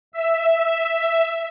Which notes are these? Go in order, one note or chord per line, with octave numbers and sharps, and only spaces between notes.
E5